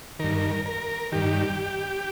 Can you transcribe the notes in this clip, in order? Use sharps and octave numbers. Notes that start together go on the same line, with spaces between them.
G2 D#3 A#4
A#4
G2 D#3 G4